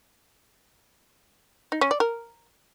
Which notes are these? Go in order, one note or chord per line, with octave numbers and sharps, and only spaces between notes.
D#4
C#4
D5
A#4